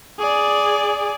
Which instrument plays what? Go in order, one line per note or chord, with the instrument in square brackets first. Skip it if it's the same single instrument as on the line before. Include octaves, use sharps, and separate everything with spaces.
[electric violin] G#4 D5